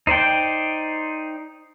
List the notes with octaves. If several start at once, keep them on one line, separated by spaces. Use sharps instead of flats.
D#4 C5 D5 G5